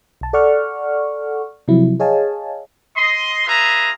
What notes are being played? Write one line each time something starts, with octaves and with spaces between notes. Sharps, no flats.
B1 A5
A4 D5 F#5 C#6 F6
C3 F3 F#3 E4
G#4 C#5 D#5 F5 G#5 A5
D#5 C6
F4 G#4 B4 E5 A#5